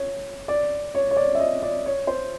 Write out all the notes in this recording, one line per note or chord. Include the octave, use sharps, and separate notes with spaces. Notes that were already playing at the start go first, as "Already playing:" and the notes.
Already playing: C#5
D5
C#5
C#5
D5
E5
D#5
D5
C#5
C5